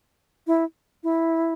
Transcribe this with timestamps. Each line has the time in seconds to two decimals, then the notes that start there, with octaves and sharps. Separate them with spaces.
0.47 E4
1.03 E4